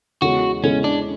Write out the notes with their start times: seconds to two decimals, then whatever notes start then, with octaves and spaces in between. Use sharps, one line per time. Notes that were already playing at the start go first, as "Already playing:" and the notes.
0.22 E2 C#3 E3 G#3 F#4
0.63 E2 C#3 E3 G#3 C#4
0.84 D4